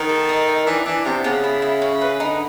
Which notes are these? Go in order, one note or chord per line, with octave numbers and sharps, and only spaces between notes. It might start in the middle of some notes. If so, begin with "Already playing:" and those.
Already playing: D#3 B3
A4
D#4
D#4
E3 D4
E3 D4
C3 B3
C#3 B3
E4
E4
C#4
B4
D3 D#4